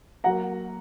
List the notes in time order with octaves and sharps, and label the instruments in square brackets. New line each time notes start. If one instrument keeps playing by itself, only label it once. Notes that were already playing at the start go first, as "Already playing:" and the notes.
[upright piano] F#3 A#3 F#5 A#5